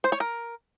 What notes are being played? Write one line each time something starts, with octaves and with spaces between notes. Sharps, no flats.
C5
C#5
A#4